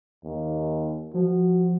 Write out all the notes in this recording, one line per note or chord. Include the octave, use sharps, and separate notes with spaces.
D#2
F3 F#4